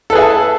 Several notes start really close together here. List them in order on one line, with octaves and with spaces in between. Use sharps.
A4 B4 G#4 E5 A5